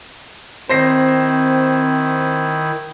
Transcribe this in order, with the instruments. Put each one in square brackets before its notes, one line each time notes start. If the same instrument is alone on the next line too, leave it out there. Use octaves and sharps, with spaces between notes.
[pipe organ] D#3 E4 [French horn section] C4 [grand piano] C5 A#6 C7